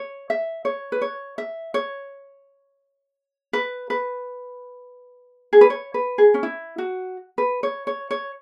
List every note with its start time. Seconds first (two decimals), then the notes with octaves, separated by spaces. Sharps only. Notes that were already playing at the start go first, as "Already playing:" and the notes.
Already playing: C#5
0.30 E5
0.65 C#5
0.92 B4
1.01 C#5
1.38 E5
1.74 C#5
3.53 B4
3.90 B4
5.53 G#4
5.61 B4
5.70 C#5
5.94 B4
6.18 G#4
6.34 C#4
6.43 E4
6.78 F#4
7.38 B4
7.63 C#5
7.87 C#5
8.11 C#5